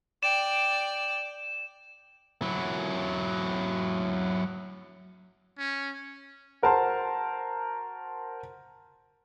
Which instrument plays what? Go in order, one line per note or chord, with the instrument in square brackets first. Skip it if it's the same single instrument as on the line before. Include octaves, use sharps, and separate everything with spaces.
[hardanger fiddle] D5 G5 [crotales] E7
[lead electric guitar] F#3 E4
[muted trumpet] C#4
[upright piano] F#4 A#4 C5 A5 C6